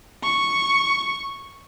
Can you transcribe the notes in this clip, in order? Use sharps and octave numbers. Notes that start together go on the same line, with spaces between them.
C#6